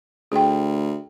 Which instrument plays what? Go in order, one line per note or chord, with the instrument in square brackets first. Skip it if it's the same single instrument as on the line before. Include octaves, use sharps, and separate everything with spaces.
[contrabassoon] D2 [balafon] G#4 G5